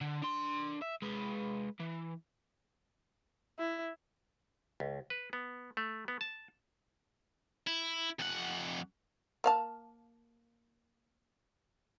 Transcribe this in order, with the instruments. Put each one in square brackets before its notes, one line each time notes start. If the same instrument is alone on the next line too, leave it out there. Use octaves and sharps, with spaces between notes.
[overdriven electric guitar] D3
D4 C6
E5
G#3 B4
E3
[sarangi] E4
[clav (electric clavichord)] C#2
B4
B3
A3
B3
A5
[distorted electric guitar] E4
F2 F#5
[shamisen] A#3 F5 A5